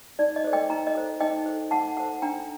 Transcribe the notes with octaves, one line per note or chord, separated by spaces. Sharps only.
D#4 D5
D#5
A4 C5
D#5 G5
D#4 G5 A#5
D#5
A4 C5
D#4 D#5 G5
A4 C5
D#4 F#5 A5
A4 C5 F#5 A5
D4 G5 A#5